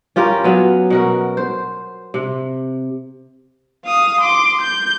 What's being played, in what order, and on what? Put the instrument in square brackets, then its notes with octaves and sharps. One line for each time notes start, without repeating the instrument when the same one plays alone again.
[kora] C#4 F4 G4 A#4
F#3 B3
B2 F#4 A#4
C5
C3
[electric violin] F5 D#6
C6 D6
G6